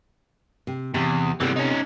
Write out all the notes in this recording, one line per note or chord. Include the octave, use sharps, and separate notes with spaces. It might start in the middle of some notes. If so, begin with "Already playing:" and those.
C3
E2 C3
C3 E3 G3 B3 A4
C#4 D#4